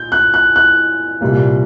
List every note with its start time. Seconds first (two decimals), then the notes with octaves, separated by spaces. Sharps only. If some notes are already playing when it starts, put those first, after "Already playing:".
Already playing: A#2 G6
0.12 F#6
0.34 F#6
0.56 F#6
1.21 C2 A#2 G3 A#3